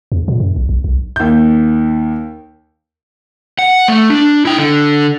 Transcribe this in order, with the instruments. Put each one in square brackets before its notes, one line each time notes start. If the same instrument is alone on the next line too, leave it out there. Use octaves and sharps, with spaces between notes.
[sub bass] E2
A#2
F#2
A#1
A#1
B1
[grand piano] D#2 G6
[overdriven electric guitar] F#5
A3
D4
E4 G5
D3